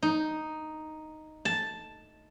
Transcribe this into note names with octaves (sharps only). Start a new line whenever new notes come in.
D#4
A5